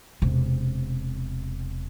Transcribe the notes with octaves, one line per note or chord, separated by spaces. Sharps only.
E1 C3